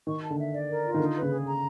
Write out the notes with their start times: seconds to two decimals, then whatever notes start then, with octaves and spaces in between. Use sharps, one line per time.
0.07 D#3 C#6
0.23 A5
0.30 D3
0.38 E5
0.53 D5
0.69 A#4
0.84 F4
0.94 D#3
0.99 D3 D#4
1.16 B4
1.22 C#3
1.31 G#4
1.46 A#5